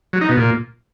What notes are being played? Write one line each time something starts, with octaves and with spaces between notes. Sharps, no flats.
F#3
D#4
B2
A#2